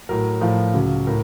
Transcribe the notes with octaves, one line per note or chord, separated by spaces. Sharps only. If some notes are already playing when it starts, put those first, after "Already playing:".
A2 F#3 A#4
A2 F3
C#2 C#3 F#3
A2 A#4